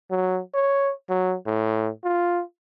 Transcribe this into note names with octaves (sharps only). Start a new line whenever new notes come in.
F#3
C#5
F#3
A2
F4